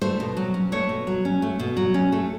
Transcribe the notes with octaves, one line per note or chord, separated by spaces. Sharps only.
A3 C5
B2
F#3
C#4
A3 C#5
B2
F#3
C#4
A3
B2
F#3
C#4
A3 A4